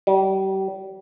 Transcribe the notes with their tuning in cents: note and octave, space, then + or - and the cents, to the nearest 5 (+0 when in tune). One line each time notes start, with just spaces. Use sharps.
G3 -35